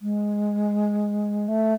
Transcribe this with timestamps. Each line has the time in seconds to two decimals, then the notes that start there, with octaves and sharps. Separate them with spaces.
0.01 G#3
1.48 A3